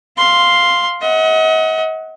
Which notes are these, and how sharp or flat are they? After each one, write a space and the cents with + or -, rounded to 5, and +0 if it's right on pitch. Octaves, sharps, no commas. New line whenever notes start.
F5 +0 C6 +0
D#5 +40 F#5 +0